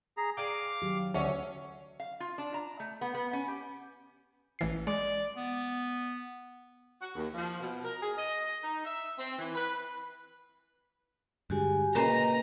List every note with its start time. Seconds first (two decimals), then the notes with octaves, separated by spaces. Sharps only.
0.17 G#4 A#5
0.37 G#4 D5 F5 G5 D6
0.82 D#3 F#3 G4
1.14 D2 C#4 E5
2.00 F5
2.20 F4
2.38 D4
2.54 A#5
2.80 A3
3.01 B3
3.15 B3
3.33 C#4
3.48 G4
4.59 A1 E3 C7
4.87 G#3 D5
5.37 B3
7.01 F#4
7.15 D#2
7.34 F3
7.60 B2
7.83 A#4
8.01 G#4
8.16 D#5
8.64 D#4
8.85 E5
9.18 C4
9.39 E3
9.55 B4
11.50 G2 D3 G#3 F#4 G4 G#5
11.95 A#2 C#3 A#3 B4 C5 D#5 A#5